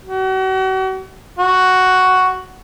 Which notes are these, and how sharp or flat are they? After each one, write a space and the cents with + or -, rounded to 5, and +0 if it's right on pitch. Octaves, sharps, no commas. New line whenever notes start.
F#4 +40
F#4 +5